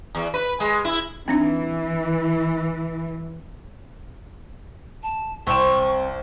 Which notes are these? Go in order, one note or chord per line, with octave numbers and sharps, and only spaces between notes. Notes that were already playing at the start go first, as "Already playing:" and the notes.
E2
B4
G#3
E4
E3 C4 D4 D#4
A5
C2 C4 G5 C#6 E7